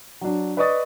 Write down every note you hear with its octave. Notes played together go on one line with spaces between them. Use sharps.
F#3 D4
B4 D5 D#5 C#6 D#6 A6